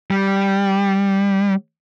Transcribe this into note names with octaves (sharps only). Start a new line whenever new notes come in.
G3